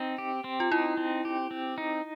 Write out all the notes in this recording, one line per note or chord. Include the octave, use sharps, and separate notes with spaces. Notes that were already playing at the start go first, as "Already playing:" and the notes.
Already playing: C4 D#4
G4
C4
F4
D#4 E4
C4
G4
C4
D#4